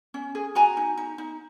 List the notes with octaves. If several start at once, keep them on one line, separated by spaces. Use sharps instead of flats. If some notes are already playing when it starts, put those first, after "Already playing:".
C#4
G#4
F#4 G#5 A#5
D#4
D#4
D#4